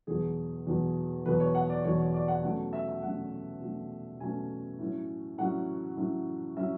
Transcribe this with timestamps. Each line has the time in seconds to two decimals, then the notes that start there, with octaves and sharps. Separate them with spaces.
0.07 E2 B2 F#3 G#4
0.67 E2 B2 F#3
1.26 E2 B2 F#3 B4
1.40 C#5
1.55 F#5
1.70 D5
1.84 E2 B2 F#3 C#5
1.99 C#5
2.14 D5
2.28 F#5
2.43 B2 F#3 A3 C#4 F#5
2.73 E5
2.88 E5
3.02 B2 F#3 A3 C#4 F#5
3.61 B2 F#3 A3 C#4
4.20 B2 F#3 A3 C#4 G#5
4.79 A2 F#3 C#4
5.38 A2 F#3 C#4 F#5
5.97 A2 F#3 C#4
6.57 A2 F#3 C#4 E5